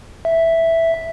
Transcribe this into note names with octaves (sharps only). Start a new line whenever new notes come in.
E5